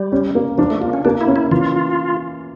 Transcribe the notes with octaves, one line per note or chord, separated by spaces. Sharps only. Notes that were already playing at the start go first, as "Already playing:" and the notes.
Already playing: G3
C#4
A#3
F3 D4
A3
A#3 F4
C#4
A#3 D4
E4
C#4
E4
E3 F4